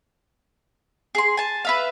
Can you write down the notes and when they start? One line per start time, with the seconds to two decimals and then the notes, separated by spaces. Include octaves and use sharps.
1.15 G#4 C6
1.37 G#5 A5
1.65 B4 E5 F5